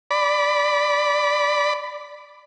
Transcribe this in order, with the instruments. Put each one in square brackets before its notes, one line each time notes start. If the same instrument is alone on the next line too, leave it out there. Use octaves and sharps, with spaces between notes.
[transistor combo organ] D5 B5